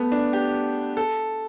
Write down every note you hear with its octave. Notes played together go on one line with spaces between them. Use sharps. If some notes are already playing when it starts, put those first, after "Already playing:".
Already playing: A3 B3
D4
G4
A4